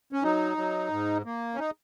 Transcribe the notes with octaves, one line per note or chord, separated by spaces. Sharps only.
C#4
F#3 D#4
F#3
G#2
A#3
C#4
D#4